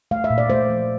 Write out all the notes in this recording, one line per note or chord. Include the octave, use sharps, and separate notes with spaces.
A3 F5
E5
A#2
D5
A3 C5
F3